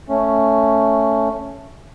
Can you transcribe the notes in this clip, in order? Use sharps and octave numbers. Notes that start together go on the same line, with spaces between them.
A3 C#4